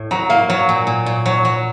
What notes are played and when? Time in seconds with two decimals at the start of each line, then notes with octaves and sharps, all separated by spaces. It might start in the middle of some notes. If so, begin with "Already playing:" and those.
Already playing: A2
0.11 F#3 A#5
0.30 A#3 F5
0.49 F#3 C#5
0.69 A#2
0.87 A#2
1.06 A#2
1.26 F#3 C#5
1.45 F#3